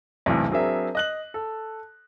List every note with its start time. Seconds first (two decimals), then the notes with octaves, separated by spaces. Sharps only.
0.26 E1 B1 E2 A2 C3
0.51 F#3 C4 D4 G#4 A#4 E5
0.95 D#5 F#6 F#7
1.34 A4